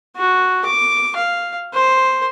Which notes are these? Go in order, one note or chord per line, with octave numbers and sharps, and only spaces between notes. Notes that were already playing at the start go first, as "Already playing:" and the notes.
F#4
D6
F5
C5